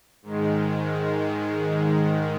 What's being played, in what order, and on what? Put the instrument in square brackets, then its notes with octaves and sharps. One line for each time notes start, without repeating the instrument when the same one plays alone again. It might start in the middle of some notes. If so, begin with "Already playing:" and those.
[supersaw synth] G#2 D#3 G#3